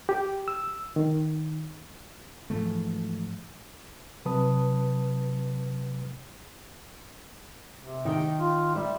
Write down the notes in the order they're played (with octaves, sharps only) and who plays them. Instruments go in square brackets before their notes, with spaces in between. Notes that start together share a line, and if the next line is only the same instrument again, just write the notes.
[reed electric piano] G4
E6
D#3
[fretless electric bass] G#2 E3 F3 A3
[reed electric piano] C3 F#3 B4 A5 D#6
[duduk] C3
[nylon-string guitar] D#3 G5
[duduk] F4
[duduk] G3 [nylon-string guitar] E5